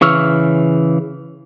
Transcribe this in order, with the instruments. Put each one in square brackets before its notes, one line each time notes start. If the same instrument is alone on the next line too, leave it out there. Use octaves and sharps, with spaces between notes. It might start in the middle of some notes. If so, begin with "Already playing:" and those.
[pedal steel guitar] C#3 E3 C#6 E6 F6